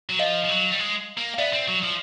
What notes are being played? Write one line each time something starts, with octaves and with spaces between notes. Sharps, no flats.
F#3
F3 D#5 F5
F3
F#3
G3
G#3
A#3
F5
B3 D5 E5
C4
F#3
F3